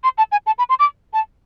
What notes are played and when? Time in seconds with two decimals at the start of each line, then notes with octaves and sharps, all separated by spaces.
0.04 C6
0.18 A5
0.32 G#5
0.46 A5
0.58 B5
0.69 C6
0.79 D6
1.13 A5